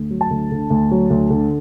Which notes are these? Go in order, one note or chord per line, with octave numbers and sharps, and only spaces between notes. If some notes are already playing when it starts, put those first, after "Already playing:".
Already playing: D2
F#3
A5
D2
D3
D2
F#3
D2
D3